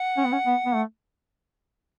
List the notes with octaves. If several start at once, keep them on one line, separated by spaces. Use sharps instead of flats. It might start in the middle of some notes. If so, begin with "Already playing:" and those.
Already playing: F#5
C#4
B3
C#4
B3
B3
A3